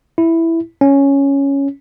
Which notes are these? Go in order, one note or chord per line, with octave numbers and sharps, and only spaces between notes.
E4
C#4